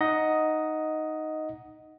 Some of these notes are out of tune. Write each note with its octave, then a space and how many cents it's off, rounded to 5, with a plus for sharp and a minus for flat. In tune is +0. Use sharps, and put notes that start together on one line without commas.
D#4 +0 D#5 +5 F#5 +0